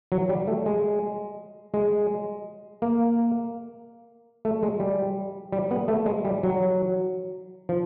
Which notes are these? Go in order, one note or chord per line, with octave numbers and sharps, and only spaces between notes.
F#3
G3
A3
G#3
G#3
A#3
A3
G#3
G3
G3
B3
A3
G#3
G3
F#3
F3